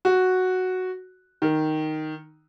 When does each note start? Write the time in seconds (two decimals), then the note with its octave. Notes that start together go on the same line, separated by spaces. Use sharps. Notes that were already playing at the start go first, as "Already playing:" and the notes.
0.05 F#4
1.42 D#3